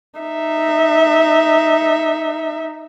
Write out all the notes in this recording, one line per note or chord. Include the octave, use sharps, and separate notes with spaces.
D#4 E5